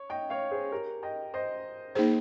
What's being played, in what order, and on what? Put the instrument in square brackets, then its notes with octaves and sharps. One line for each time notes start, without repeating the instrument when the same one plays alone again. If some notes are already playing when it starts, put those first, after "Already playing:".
Already playing: [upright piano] C#5
D#5 G5
C#5 F5
G#4 C5
G4 A#4
D#5 G5
C5 D#5
[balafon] A#3 D#4 G#4 C5